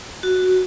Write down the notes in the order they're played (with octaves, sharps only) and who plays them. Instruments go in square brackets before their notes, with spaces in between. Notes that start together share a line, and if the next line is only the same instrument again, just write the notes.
[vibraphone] F#4